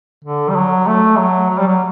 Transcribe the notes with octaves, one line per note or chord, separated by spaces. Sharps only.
D3
G3
F#3
A3
F#3
F#3
G3
F#3